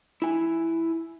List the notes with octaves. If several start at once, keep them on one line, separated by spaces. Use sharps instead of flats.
E4 G#5